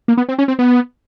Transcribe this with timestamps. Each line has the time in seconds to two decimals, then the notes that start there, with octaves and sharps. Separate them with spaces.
0.08 A#3
0.17 B3
0.29 C4
0.39 C#4
0.48 C4
0.59 B3